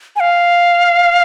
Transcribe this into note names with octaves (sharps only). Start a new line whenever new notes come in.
G#5
F5